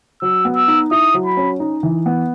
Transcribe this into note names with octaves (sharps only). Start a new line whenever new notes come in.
F#3 E6
B3
E6
D#4
E4 D#6
F#3
B5
C#4
D#4
E3
B3